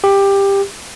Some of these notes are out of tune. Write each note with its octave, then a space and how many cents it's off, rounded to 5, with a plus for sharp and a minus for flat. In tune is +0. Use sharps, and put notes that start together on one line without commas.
G4 +15